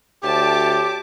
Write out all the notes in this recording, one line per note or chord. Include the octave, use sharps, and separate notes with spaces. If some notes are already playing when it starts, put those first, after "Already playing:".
D2 G4 C#5 A5 D6